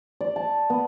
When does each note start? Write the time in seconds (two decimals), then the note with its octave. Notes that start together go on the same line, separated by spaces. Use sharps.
0.21 D5
0.36 A5
0.70 B3